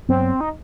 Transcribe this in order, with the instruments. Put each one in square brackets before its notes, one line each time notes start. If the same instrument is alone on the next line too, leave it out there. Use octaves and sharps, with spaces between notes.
[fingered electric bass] G2 F#3 B3 [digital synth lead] C4
[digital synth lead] D#4